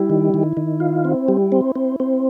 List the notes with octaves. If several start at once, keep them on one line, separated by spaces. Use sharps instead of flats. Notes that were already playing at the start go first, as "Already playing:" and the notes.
Already playing: G3 E4
D#3
D#3
D#3
F4
C4
G3
C4
C4
C4